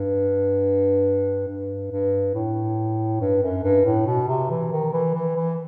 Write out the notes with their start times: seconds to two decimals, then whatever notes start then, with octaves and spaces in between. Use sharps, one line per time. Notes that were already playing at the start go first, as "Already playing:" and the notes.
Already playing: G2
1.47 G2
1.91 G2
2.34 A2
3.21 G2
3.42 F#2
3.63 G2
3.85 A2
4.06 B2
4.28 C3
4.50 E3
4.72 D#3
4.93 E3
5.15 E3
5.36 E3